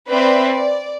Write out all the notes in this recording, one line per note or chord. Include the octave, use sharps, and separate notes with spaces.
C4 B4 D5 E5
D5